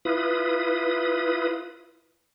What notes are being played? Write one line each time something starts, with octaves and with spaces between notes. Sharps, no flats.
E4 F4 B4 D#6